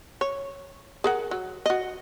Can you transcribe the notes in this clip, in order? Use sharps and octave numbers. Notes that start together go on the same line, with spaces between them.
C#5
G#4 A#4 F#5
F#3
F#4 D#5